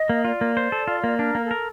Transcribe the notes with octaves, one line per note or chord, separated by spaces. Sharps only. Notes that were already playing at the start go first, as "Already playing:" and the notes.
Already playing: D#5
A#3
F4 D5
A#3
C5
A4
F4
A#3
D4 A#4
A#3
A4
A#4